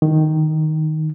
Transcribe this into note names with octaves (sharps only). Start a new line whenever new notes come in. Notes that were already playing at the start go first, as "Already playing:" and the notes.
D#3